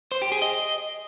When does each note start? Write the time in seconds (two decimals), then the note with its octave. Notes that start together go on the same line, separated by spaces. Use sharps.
0.12 C5
0.22 G4
0.32 G#4
0.42 D#5